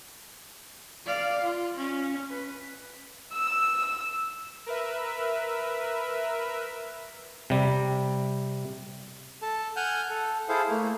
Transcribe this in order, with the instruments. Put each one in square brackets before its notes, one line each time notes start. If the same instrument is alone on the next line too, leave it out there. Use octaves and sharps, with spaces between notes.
[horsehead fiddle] D5 F5
F4
C#4
B4
[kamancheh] E6
[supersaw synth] A#4 B4 E5
[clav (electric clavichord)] C3 G3
[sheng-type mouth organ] A4 A5
F#5 G#5 F6 G6
A4
E4 G#4 A4 C5 F5
A3 A#3